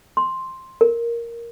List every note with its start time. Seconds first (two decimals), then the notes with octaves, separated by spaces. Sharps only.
0.17 C6
0.81 A#4